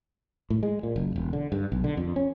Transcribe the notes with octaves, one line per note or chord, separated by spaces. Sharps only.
A2
G#3
A#2
F#1
E1
D3
G2
B1
D3
F2
C#4